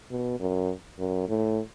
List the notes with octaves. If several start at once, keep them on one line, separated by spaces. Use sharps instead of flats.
B2
F#2
F#2
A2